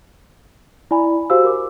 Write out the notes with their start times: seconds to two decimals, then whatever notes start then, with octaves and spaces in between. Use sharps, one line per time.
0.91 E4 D5 G#5 B5
1.30 F#4 G4 C5 F5 E6
1.45 A#4 D6